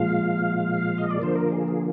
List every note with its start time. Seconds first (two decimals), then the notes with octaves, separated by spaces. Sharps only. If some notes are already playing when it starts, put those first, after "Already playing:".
Already playing: A#2 F3 G#3 F5
0.98 D#5
1.11 D5
1.19 D3 F3 A#3 C5
1.35 A#4
1.52 G#4
1.68 G#4